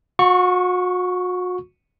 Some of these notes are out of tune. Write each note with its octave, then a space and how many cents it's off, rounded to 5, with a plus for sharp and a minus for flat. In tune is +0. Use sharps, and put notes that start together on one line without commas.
F#4 -40 C#6 +0